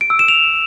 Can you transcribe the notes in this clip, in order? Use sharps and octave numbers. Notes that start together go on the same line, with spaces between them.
D7
E6
E7
F7